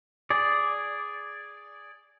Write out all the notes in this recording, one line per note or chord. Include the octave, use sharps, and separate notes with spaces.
G#4 D5